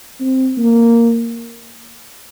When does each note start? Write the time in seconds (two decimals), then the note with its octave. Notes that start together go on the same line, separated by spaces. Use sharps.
0.20 C4
0.58 A#3